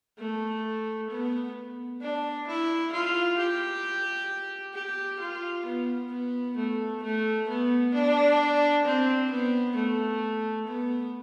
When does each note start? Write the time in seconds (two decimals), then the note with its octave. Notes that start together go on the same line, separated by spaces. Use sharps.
0.19 A3
1.10 B3
2.01 D4
2.47 E4
2.92 F4
3.38 G4
4.74 G4
5.20 F4
5.66 B3
6.12 B3
6.57 A3
7.03 A3
7.49 B3
7.95 D4
8.85 C4
9.31 B3
9.76 A3
10.68 B3